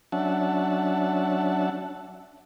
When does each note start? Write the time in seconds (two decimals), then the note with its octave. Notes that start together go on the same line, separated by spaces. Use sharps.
0.12 F#3 C#4 D4 E5 F#5 A5